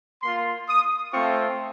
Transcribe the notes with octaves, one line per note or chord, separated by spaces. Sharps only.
A#3 F4 C6
D#6
A3 C4 F4 C#6